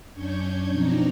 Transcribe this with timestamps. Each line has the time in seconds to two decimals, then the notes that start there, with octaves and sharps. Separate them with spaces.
0.12 F#2 C#4 D4 C#6 G6 G#6
0.71 B2 F3 C4 D4 D#4 A#5